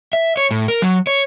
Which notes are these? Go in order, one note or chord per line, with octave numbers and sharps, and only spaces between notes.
E5
C#5
A2
A#4
F#3
C#5